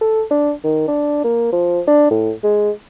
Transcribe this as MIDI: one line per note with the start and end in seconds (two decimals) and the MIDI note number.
0.01 0.23 69
0.31 0.52 62
0.64 0.86 51
0.88 1.22 62
1.24 1.51 58
1.53 1.81 53
1.87 2.08 62
2.11 2.32 45
2.44 2.71 56